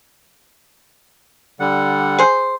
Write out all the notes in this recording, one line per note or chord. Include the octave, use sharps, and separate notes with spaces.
D3 G3 F#5
G#4 C5